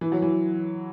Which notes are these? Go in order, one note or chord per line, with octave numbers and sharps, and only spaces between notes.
E3
F#3
E3